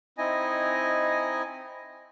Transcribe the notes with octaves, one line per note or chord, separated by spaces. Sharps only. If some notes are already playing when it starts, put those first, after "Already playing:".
C4 D#4 E4 D#5 G#5